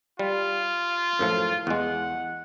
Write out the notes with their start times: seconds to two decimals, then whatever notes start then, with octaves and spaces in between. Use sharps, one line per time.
0.19 G3 F4
1.19 F#2 A2 F3
1.67 E2 G#3 F#5